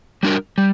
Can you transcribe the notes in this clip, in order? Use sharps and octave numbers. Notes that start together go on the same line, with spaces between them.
G3 D4 F#4 A#4
G3